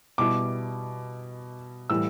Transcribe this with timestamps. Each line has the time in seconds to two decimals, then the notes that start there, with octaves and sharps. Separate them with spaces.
0.18 B2 G3 E4 D6
1.90 A2 E3 G3 E6